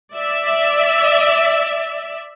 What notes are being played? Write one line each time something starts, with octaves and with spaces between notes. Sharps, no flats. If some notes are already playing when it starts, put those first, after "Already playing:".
D5 E5